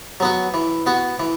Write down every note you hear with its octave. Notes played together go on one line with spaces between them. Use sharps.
F#3 B3 F#4
E3
B3 F#4
E3